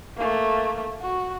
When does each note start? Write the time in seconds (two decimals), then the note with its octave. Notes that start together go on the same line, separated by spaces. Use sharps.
0.17 A3 A#3
1.01 F#4